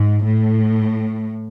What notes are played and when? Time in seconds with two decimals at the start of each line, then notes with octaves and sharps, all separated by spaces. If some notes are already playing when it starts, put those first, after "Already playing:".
Already playing: G#2
0.23 A2